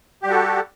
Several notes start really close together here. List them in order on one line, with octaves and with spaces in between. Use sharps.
G4 G3 F#4 A4